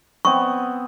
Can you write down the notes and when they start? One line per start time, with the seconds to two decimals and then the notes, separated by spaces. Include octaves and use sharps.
0.25 B3 C4 D#5 C#6